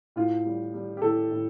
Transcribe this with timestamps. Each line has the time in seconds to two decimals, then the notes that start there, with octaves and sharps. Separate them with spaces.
0.16 A2 F4
0.45 G3
0.74 G3
0.97 G4
1.02 A2 A4
1.30 A2